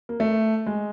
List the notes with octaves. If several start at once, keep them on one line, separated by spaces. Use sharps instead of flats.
A#3
A3
G#3